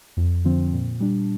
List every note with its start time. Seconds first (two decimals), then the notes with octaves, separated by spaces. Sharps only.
0.17 F2
0.45 D3 F3 C4
0.73 A#2
1.00 G3 D4